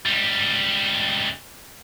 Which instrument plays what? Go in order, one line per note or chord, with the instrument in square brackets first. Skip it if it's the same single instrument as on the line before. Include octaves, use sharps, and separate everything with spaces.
[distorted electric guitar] C#2 G3